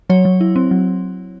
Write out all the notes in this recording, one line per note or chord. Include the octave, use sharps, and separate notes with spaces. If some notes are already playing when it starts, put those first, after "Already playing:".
F#3 C#5
F#3
E4
C4
F#3